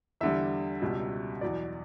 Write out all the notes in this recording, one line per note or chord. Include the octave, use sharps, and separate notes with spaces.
E2 D3 G3 E5
C#2 B2 G3
E2 B2 F#3 D5